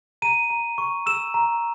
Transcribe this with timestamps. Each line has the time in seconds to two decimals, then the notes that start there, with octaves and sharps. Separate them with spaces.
0.22 A#5 D#7
0.50 A#5
0.78 C#6
1.06 E6 E7
1.34 A#5